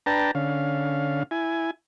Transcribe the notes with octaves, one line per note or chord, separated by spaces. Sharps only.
D4 B4 G5 A5 A#5
D3 C#4 F5
E4 G#5